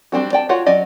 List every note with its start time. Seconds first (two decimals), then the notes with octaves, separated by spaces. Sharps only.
0.12 G3 C4 D4 F#4
0.33 D5 G5 A5
0.49 F4 F#4 C#5 F#5
0.66 F#3 C#4 F#4 D5 D#5